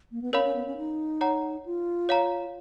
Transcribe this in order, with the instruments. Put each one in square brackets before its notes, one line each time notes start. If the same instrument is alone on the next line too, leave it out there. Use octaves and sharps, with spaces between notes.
[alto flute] A#3
B3
[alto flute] C#4 [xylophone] A#4 C#5 F5 B5
[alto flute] C#4
B3
C#4
D#4
[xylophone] C#5 F#5 A#5
[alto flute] F4
[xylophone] C#5 F5 A#5